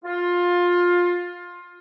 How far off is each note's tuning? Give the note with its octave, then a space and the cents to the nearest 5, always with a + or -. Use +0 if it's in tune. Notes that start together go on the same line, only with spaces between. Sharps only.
F4 +15